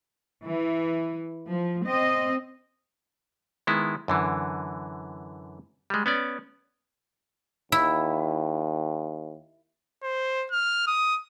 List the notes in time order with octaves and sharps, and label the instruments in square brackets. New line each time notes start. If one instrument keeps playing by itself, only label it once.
[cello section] E3
F3
C4 D#5
[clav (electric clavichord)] D#3 G#3 B3 E4
F#2 D3 E3
G3 G#3
B3 C#4 D5
[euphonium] D#2 [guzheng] E4
[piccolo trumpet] C5
F6
D#6